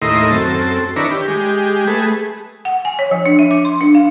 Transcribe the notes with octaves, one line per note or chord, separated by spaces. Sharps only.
D#2 A2 E4 A#4 D#5 C6
F#2 C4 A4
D#3 D4 E4 A#4 B4 C#5
G4
G#3 G4
A3 G#4 B4
F#5
G#5
C#5
F3
D4
E5
D6
C6
D4
F5